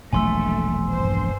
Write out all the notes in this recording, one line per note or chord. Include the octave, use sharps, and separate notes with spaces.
E1 A#1 F#3 A3 G#5 C6 E6
G2 C5